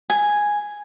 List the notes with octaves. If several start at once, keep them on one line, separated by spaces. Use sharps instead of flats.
G#5